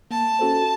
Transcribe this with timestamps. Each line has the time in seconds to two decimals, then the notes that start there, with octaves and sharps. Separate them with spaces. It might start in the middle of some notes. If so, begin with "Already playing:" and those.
0.11 A#3 A5
0.39 C#4 F#4 A4 C5